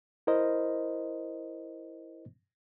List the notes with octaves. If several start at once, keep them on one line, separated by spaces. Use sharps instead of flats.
E4 A#4 C5 D#5